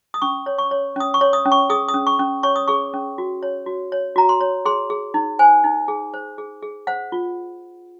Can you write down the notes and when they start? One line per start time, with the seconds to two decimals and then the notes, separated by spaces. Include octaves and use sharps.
0.14 D#6
0.22 C#4 C#6
0.46 C#5
0.58 C#6
0.71 C#5
0.96 C#4 D#6
1.14 C#6
1.21 C#5
1.33 D#6
1.45 C#4
1.52 C#6
1.70 G#4 D#6
1.89 D#6
1.94 C#4
2.07 C#6
2.19 C#4
2.43 C#5 C#6
2.56 D#6
2.68 G#4 C#6
2.93 C#4
3.18 F#4
3.43 C#5
3.66 F#4
3.92 C#5
4.16 F#4 A#5
4.29 C6
4.41 C#5
4.65 G#4 C6
4.90 G#4
5.14 D#4
5.39 C5 G#5
5.64 D#4
5.88 G#4
6.14 C5
6.38 G#4
6.63 G#4
6.87 C5 F#5
7.12 F4